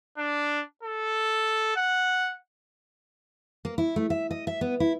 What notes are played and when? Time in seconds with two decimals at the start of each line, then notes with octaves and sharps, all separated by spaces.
0.18 D4
0.83 A4
1.76 F#5
3.65 A#3
3.78 E4
3.96 A3
4.10 E5
4.31 D#5
4.47 E5
4.61 B3
4.80 E4